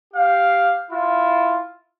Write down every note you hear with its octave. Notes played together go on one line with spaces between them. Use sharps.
G4 F5
E4 F4